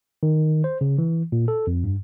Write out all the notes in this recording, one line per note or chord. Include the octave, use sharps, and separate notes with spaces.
D#3
C5
C#3
E3
A#2
A4
F2
G2